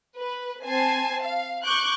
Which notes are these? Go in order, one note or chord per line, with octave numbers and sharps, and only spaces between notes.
B4
C4 G#5 A5 C7
F5
C#6 D6 F#6 G6